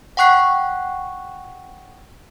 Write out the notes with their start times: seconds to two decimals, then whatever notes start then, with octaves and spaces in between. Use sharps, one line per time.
0.17 F#5 G5 C#6 F#6 C7